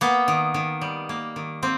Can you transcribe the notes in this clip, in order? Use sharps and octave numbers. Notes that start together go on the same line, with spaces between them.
A#3 B3
D#3
D#3
G3
A#3
D#3
A#3 C4